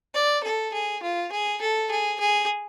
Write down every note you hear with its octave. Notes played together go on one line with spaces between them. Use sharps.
D5
A4
G#4
F4
G#4
A4
G#4
G#4